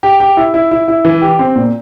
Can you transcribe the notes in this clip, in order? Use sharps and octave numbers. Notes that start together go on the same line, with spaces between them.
G4
G4
E4
E4
E4
E4
E3
G4
C4
A#2